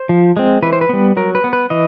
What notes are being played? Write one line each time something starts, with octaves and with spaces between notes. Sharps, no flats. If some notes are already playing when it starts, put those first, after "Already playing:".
Already playing: C5
F3
G#3 C4
E3 B4
C5
B4
G3 B3
F#3 A#4
B4
B3
B4
E3 D#5